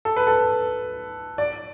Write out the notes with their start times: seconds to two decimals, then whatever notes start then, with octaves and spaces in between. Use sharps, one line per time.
0.05 A4
0.17 B4
0.27 A4
1.38 D5